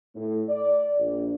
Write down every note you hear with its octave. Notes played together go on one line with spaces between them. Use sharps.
A2
D5
A#1